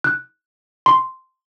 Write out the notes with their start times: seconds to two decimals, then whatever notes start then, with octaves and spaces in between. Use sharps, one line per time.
0.04 F#6
0.86 C6